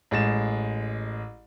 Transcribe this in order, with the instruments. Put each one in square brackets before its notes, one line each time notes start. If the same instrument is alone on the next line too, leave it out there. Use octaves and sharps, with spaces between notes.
[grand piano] A1 G#3 A6 E7